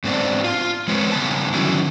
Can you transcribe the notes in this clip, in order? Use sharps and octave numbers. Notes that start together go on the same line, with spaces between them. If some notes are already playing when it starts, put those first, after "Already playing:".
G#2 B3 C4 D4
F4
F3 G#3 C4 B4 C#5
C#3 G3 B3 A5
D3 D#3 F#3 C#4 E4